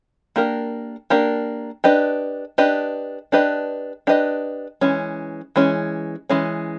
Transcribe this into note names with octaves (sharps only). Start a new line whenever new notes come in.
A#3 D4 G4 A#4
A#3 D4 G4 A#4
D4 G4 B4 D#5
D4 G4 B4 D#5
D4 G4 B4 D#5
D4 G4 B4 D#5
E3 G#3 C#4
E3 G#3 C#4
E3 G#3 C#4